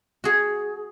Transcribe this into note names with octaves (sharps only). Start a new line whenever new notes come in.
F#4 G#4